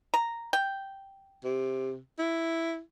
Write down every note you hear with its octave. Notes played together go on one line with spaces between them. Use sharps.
A#5
G5
C3
E4